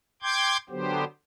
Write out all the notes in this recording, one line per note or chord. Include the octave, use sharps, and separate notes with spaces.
G5 C6 D6 G6 G#6
D3 F#3 B3 G4 C5